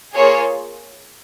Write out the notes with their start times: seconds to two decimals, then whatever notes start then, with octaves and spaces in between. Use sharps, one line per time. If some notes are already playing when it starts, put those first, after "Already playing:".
0.14 A#3 F4 G#4 C#5